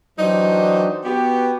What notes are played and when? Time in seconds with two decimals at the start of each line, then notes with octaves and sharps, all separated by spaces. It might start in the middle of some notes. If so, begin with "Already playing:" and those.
0.19 E3 F#3 D4 D#4 G4 C5
1.04 B3 F#4 G4